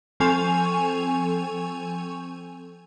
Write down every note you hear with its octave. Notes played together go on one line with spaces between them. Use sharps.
F3 C4 A4 G#5 C#6 F7